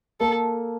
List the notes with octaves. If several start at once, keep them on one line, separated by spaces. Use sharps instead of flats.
A#3 A4